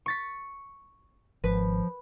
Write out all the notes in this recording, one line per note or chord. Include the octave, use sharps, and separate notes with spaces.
C#6 A6 B6
G#1 F3 B4